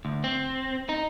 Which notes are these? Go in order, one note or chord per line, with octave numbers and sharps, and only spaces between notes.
D2
C4
D#4